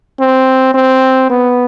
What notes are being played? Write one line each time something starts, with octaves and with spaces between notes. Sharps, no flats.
C4
C4
B3